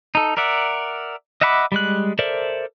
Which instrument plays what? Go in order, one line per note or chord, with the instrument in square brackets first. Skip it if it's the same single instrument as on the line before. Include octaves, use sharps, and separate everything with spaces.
[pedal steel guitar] D#4 A4
A#4 D5 E5 F#5
D#5 E5 F#5 B5 D6
G3 G#3 F#6
A4 A#4 C5 D5 E5